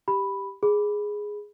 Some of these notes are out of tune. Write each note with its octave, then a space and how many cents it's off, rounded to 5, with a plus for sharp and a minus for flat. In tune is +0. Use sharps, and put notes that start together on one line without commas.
G4 +0 B5 +0
G#4 +0 B5 +0